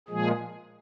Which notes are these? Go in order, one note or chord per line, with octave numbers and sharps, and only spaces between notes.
A#2 F3 G#3 G#4